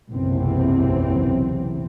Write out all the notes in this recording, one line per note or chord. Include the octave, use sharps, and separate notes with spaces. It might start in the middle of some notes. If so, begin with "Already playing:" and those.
F#1 B1 E2 C3 E3 C4